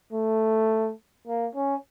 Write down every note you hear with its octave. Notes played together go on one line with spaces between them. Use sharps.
A3
A#3
C#4